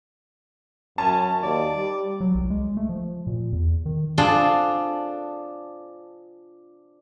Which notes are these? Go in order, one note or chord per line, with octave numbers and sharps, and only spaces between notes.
F#2 C#4 A5
D#2 D5
G3
F#3
C2
G#3
A3
F3
A#2
E2
D#3
D4 F4 G#4 A4 C5